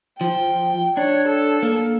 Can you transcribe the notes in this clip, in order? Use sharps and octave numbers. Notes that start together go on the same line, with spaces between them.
F3 G5
D4 C#5
A4
A#3